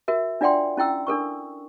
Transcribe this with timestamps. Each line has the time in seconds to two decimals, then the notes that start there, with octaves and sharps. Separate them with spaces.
0.08 F#4 A#4 E5
0.41 D4 F4 D5 F#5 G5 C6
0.77 C#4 E4 G5 E6
1.07 D4 A4 A#4 C#6